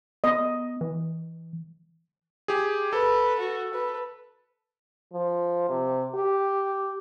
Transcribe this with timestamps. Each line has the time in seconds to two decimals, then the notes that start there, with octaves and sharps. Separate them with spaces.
0.24 B3 D#5
0.81 E3
2.48 G4 G#4
2.93 A4 B4
3.39 F#4
3.74 B4
5.13 F3
5.69 C3
6.15 G4